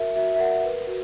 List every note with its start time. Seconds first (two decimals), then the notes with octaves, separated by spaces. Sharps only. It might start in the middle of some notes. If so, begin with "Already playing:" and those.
Already playing: F#4 A#4 E5
0.16 F#4 E5
0.35 E5
0.39 A#4 F#5
0.64 B4
0.87 F#4